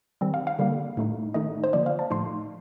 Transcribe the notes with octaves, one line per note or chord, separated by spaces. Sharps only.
D#3 G3 C4
F5
F5
D3 G3 A#3
A2 A3 D#4
D#3 A3 D#4 D#5
C5
D3 F3 A#3 D5
F5
A5
A2 F3 A3 D#4 C6